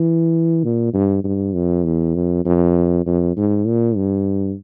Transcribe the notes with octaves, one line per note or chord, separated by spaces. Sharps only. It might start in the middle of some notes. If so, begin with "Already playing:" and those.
Already playing: E3
A#2
G2
G2
F2
E2
F2
F2
F2
G#2
A#2
G2